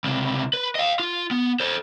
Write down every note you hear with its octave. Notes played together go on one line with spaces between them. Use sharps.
C#2 C3
B4
D#5 F5
F4
B3
A4 C5